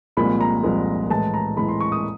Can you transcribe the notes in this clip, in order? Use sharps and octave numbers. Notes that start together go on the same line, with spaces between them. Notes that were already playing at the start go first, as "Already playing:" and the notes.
C2 A#2 F3 G#3 B5
A#5
C2 A#2 F3 G#3
A2 E3 G#3 A5
A#5
A2 E3 G#3 B5
C6
C#6
D#6